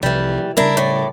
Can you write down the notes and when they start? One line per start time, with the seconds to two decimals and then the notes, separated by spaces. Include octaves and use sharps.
0.03 C2 C3 E3 F3 G3
0.57 C#3 G3 D4 E4 A#4
0.77 A2 D5